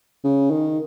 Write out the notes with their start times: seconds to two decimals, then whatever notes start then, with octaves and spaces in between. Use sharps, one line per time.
0.24 C#3
0.51 D#3